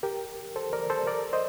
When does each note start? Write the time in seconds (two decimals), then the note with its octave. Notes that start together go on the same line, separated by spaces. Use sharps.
0.03 G4 A#4
0.56 A4 C5
0.73 A#4 D5
0.90 A4 C5
1.07 A#4 D5
1.33 C5 D#5